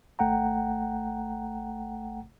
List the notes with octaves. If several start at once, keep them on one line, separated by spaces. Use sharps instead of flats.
G#1 A3 F#5 G5 A#5